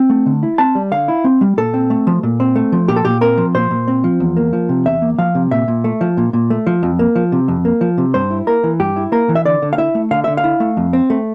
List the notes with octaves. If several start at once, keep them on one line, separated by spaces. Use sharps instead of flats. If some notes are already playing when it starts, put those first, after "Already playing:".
Already playing: C4
A3
D3
E4
C4 A5
G3
D3 F5
E4
C4
G3
A#2 A4
C4
A3
F3
A#2
C4
A3
F3
A#2 G4
A4
A#2 G4
C4 A#4
F3
A#2 C5
A#2
C4
F3
E2
A#3
F3
C3
E2 E5
A#3
F3 F5
C3
A#2 E5
A#2
A3
F3
A#2
A#2
A3
F3
F2
A#3
F3
C3
F2
A#3
F3
C3
G2 C5
E4
A#3 A#4
E3
G2 G4
E4
A#3 A#4
E3
E5
D3 D5
D3
F5
E4 E5
A3
D3 F5
D3 E5
F5
E4
A3
F2
C4
A3